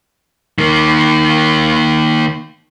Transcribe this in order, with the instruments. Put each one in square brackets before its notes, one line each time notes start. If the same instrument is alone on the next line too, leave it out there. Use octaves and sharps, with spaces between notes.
[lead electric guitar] D#3 A#3